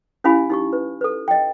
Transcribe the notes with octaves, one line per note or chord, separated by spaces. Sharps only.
C#4 E4 G4 F5 G#5 B5
D#4 G4 C#6
B4
A4 B4
D#5 G5